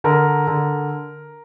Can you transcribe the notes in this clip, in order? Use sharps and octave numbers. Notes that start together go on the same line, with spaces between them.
D3 A#4
D3